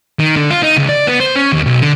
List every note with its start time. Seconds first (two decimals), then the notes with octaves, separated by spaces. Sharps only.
0.20 D#3
0.37 D3
0.50 F4
0.62 D#4
0.77 C#2
0.89 D5
1.07 B3
1.20 C5
1.36 C#4
1.53 D#2
1.66 B1
1.80 D3